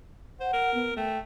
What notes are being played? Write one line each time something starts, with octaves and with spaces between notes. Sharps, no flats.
C5 F#5
A#4
B3
A3 G5